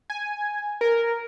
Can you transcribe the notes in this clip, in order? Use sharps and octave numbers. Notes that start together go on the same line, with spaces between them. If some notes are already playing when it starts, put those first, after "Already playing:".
G#5
A#4